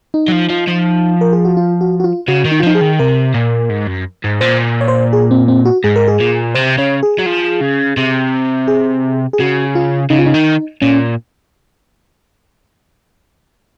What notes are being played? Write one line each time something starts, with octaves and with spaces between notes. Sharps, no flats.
D#4
F#3
F3
F3
F3
A#4
G#4
F#4
F4
F#4
F#4
F4
C#3 F#4
D#3
D#4
F4
F3 D#4
G#4
D#3
C3 A#4
A#2
G#2
F#2
G#2
A#2 C5
C#5
C5
G#4
C4
C4
F#4
G#2 G#4
A#4
G#4
A#2
C3 C5
C#3 C#5
G#4
F#3
F3
C#3
C3
G#4
G#4
C#3 F#4
F4
C#3 D#4
F4
D#4
D#3
A#2 C#4